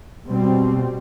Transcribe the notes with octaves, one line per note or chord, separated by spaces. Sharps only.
B2 G3 C4